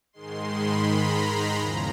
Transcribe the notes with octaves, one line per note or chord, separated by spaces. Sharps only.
G#2 D#3 G#3 C6
B5
A#5
E2 C#3 F3